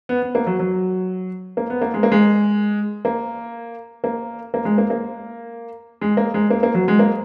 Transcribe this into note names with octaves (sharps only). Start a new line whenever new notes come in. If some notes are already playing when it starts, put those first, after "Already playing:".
B3
B3
A#3
F#3
F#3
A#3
B3
A#3
G#3
A#3
G#3
A#3
A#3
A#3
G#3
A#3
A#3
G#3
A#3
G#3
A#3
A#3
F#3
G#3
A#3